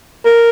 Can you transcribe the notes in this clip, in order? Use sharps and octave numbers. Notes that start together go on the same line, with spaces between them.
A#4